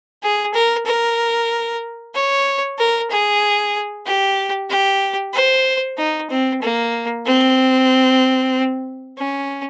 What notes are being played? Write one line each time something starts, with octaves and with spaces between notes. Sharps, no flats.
G#4
A#4
A#4
C#5
A#4
G#4
G4
G4
C5
D#4
C4
A#3
C4
C#4